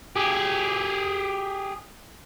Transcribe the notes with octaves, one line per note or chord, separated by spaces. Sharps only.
G4 G#4